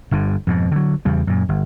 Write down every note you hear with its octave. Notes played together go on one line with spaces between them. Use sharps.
G1 G2 D3
F2 G#2 B2
D3 F#3
E2 C#3 G3
F#2 A#2
G1